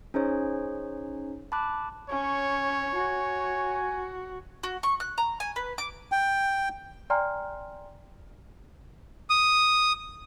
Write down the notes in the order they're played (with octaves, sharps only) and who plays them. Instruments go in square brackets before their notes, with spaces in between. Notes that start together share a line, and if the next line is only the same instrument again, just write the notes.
[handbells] C#4 D#4 G#4 C5 C#5
A5 B5 D6 F#6
[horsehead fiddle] C#4 [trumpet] C#5
[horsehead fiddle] F#4 [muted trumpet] G#5
[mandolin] F#4
C#6
F#6
A#5
G#5
B4
D6
[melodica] G5
[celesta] D5 G5 G#5 A#5 C6 F6
[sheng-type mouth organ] D#6